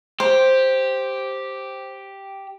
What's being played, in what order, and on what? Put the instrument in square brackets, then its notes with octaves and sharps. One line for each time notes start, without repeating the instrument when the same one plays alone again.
[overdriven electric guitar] G4 [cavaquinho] C5